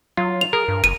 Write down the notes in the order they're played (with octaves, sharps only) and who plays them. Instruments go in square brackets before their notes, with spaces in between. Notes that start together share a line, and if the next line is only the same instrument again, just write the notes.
[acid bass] F#3 [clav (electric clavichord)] F4
[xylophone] F7
[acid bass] G#4 [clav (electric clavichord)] A#4
[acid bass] G2
[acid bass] F#1 [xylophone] D#7